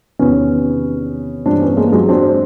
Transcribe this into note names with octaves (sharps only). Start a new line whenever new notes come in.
E2 C3 D#3 B3 C#4
G2 E3 C4 D4
B3 C#4
G#3 A#3
F#3 G#3
C4 D4